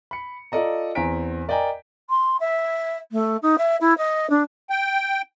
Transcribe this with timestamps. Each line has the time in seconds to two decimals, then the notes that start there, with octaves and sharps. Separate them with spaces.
0.11 B5 C#7
0.52 F4 A4 D5 D#5 A#5
0.95 E2 C4 G#5 A#5 B6 D7
1.48 A#4 D5 D#5 G5 G#5 A#5
2.09 C6
2.40 E5
3.12 A3
3.42 D#4
3.58 E5
3.80 E4
3.97 D#5
4.30 D4
4.70 G5